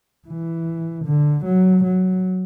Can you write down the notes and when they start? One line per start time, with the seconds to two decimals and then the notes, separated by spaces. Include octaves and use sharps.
0.28 E3
1.05 D3
1.45 F#3
1.83 F#3